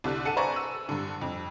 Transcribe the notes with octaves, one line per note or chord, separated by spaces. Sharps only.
C2 D3 D4 F#6
A4 F#5 A5 C#7 D#7 E7
B4 C5 D5 G#5 A#5 C#6
E6 D#7
G2 D3
F2